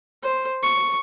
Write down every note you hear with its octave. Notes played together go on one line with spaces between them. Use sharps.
C5
C#6